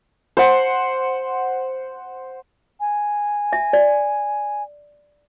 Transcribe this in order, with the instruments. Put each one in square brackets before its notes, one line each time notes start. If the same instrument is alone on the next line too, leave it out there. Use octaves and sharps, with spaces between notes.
[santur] C5 F#5
[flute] G#5
[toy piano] E5
D5